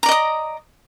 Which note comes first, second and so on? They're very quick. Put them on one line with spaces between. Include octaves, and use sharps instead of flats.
A#5 D5 D#5 D#6